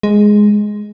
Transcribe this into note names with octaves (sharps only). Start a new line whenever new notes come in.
G#3